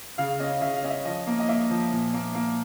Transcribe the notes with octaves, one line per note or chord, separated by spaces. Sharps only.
C#3 F5
C#4 D#5
C#3 E5
F5
C#4 D#5
E5
F3 D#5
A#3
D#5
A#3 E5
F3
A#2
A#3
A#3